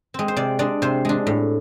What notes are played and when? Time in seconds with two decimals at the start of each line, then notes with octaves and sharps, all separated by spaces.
0.14 G#3 C4
0.28 C5
0.37 C3 D5
0.59 G#3 D4 D5
0.82 C3 C5
1.05 G#3 D4
1.27 A2